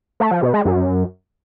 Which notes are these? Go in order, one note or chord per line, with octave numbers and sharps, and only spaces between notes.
A3
F3
B2
G#3
F#2